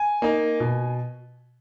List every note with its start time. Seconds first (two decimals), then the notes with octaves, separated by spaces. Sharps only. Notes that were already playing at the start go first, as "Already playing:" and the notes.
Already playing: G#5
0.22 A#3 D#4
0.60 B2